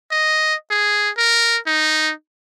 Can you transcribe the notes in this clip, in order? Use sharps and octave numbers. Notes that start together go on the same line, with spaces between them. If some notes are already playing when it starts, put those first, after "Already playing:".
D#5
G#4
A#4
D#4